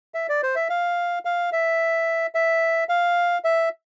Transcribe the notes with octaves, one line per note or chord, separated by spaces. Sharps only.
E5
D5
C5
E5
F5
F5
E5
E5
F5
E5